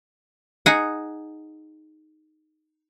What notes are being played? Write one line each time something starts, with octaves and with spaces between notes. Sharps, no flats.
D#4 G#4 F#5